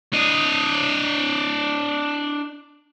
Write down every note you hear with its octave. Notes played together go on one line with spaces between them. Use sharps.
D4 D#5